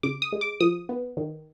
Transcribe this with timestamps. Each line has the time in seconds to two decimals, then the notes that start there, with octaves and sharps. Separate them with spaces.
0.03 C#3 D6
0.22 D#6
0.32 G#3
0.41 D6
0.61 F3 D#6
0.89 B3
1.17 D#3